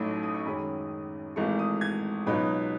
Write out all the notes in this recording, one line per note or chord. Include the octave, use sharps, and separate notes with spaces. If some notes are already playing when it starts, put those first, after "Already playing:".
Already playing: A1 A2 F#3 A3 D#4 B5
D#6
C#6
F#2 D#3 G#3 C#4 B5
G#1 G#2 E3 A3 C#6
D#6
G#6
C#2 B2 F#3 B3 D#4 B5